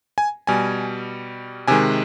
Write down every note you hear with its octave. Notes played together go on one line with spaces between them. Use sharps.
G#5
B2 G3 G#5
C3 D#3 G#3 G#5